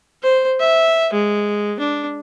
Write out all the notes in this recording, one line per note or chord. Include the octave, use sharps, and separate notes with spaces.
C5
E5
G#3
D4